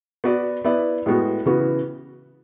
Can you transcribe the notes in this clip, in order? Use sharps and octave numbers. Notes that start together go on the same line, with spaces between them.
B3 F#4 B4 D5
B3 E4 B4 D5
A2 G#3 B3 F#4
C#3 E3 B3 F#4 B4